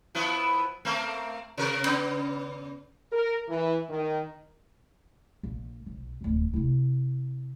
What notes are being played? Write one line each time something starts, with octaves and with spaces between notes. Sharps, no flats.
F3 B3 E4
A3 A#3 C4
C3 A#4
C#3 B3
A#4
E3
D#3
A#1
B1
D1 D#2
C3 E4